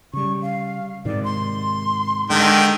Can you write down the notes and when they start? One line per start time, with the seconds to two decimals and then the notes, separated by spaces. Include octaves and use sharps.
0.13 C#3 G3 C#6
0.42 F5
1.05 G#2 C3 D#3 D5
1.24 C6
2.30 D3 D#3 G#3 G5